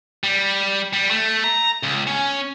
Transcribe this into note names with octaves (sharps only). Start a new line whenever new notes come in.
G3
G3
A3
A#5
C#2
C#4